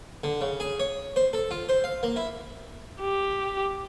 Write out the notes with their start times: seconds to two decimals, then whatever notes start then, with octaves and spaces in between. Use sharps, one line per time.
0.24 D3
0.41 C#3
0.60 G#4
0.80 C#5
1.16 C5
1.33 A4
1.51 F4
1.69 C5
1.84 F5
2.03 A#3
2.16 E4
3.01 G4